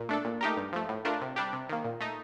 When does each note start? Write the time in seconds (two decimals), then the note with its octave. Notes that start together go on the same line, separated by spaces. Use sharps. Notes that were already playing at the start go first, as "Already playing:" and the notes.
Already playing: A#2
0.09 A3 D4 A4
0.25 A#2
0.41 A3 D#4 G4 A#4
0.57 G2
0.73 F3 A3
0.89 A2
1.05 A3 D4 F4 A#4
1.21 C3
1.36 G3 D4 G4
1.53 C3
1.69 D#3 A#3
1.84 A#2
2.01 A3 D#4